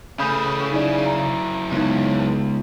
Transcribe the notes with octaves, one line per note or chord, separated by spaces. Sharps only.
C#3 A3 C#4 B5 D#6 G6
F#2 D#4 E4 G#4 D5
A#5
C#2 B3 D#4